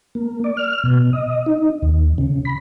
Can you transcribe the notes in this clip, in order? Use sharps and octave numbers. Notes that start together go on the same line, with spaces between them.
A#3
D5
F6
B2
D#5
D#4
D#2
C#3
B5